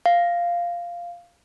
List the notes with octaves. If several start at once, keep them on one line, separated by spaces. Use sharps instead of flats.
F5